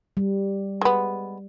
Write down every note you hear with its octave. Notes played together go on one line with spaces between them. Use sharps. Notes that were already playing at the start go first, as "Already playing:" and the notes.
G3
G#3 B3